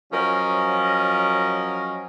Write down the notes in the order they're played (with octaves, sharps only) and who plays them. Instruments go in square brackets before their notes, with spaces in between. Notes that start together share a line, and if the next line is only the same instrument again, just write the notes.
[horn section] F3 F#3 C#4 A#4 D#5